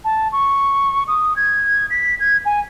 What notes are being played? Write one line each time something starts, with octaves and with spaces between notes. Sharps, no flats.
A5
C#6
D#6
G#6
B6
G#6
G#5